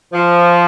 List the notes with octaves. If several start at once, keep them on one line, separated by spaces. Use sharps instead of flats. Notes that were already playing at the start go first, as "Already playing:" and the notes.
F3